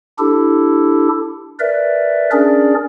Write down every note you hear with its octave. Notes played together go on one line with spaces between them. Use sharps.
D4 E4 G4 A4
A#4 B4 D5 E5
C#4 D4 G#4 A#4 D5